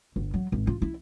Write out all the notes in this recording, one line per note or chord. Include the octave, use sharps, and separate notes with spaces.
G1
F#3
G#1
F4
E4